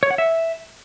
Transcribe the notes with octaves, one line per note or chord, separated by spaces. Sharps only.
C#5
F#5
E5